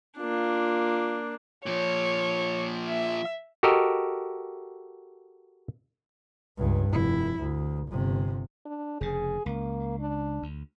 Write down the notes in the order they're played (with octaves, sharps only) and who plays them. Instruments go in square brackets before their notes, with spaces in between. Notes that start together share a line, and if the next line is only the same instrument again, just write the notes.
[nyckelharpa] A#3 D4 [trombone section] F4
[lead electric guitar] A#2 F3 [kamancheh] C#5
[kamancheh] E5
[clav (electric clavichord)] F#4 G4 A4 A#4 D#5
[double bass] C#2 G2
F1 E4
D2
G1 C3
[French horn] D4
[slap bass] F1 C#3 [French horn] G#4
[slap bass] C#2 [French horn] A#3
[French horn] D4
[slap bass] D2